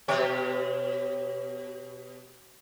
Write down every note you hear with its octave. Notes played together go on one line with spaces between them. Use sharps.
B2 G4 C#5